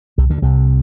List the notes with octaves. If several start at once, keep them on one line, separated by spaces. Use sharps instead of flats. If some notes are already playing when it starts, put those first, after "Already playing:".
C2 C3
D2 D3
C2 C3